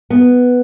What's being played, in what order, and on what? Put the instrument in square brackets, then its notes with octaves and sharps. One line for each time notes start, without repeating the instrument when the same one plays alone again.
[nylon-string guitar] B3